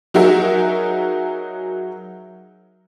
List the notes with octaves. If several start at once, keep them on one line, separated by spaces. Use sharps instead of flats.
F#3 D#4 F#4 G#4 A#4 E5